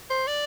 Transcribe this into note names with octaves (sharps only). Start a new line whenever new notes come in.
C5
D5